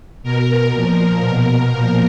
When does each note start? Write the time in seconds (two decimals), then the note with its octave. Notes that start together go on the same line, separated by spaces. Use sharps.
0.23 B2 A#4
0.72 A#2 F3 A#4
1.22 B2
1.71 A#2 F3 A#4